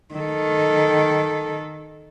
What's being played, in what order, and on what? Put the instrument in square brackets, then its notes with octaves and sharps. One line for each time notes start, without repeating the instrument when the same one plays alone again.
[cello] D#3 A4